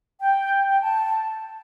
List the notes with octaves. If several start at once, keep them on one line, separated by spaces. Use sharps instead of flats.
G5
G5
A5